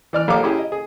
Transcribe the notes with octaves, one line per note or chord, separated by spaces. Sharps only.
E3 D5 F6
A#1 G4 A4 C#5 F5 D6
C#4 E4 G4 G#4
D#5
G#4